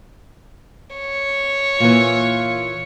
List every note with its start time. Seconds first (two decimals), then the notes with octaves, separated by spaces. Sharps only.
0.97 C#5
1.80 A#2 E3 F4